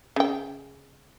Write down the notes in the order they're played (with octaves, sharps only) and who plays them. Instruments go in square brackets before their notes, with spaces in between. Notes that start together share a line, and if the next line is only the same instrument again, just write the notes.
[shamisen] C#3 G5